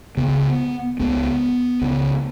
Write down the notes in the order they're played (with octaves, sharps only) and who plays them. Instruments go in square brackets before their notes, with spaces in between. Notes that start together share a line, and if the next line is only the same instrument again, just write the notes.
[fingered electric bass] C#2 C#3 B3
C#2 C#3 B3
C#2 C#3